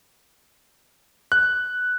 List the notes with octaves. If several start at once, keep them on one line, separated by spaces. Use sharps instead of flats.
F#6